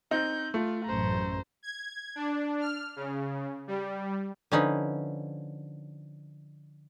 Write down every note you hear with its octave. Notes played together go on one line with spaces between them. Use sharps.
C4 D#4 G6
A3 F4
A1 F#2 C5 A#5
G#6
D4
F6
C#3
G3
D3 F3 C#4 D#4 B4